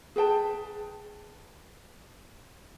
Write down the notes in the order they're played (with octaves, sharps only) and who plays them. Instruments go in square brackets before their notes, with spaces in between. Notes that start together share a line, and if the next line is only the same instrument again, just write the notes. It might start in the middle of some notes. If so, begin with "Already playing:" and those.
[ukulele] G#4 B4 G5 A5